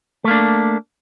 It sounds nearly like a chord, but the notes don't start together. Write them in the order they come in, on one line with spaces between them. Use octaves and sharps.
A3 A#3 D4